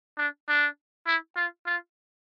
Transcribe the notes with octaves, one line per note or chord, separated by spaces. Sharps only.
D4
D4
E4
F4
F4